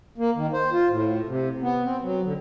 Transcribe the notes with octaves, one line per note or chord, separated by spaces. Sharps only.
A#3
D#3
C5
F4
A2
C3
B3
C4
F#3
D3